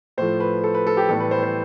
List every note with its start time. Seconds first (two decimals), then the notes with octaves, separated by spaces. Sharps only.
0.18 A2 F3 A3 C5
0.40 B4
0.64 A4
0.75 B4
0.87 A4
0.97 G4
1.09 A2 E3 G3 B3 A4
1.20 B4
1.31 C5
1.43 C5